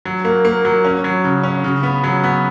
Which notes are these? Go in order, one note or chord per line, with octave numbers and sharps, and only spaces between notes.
F#3
A#3
A#3
F#3
C#4
F#3
C#3
C#4
C#3
B3
F#3
B3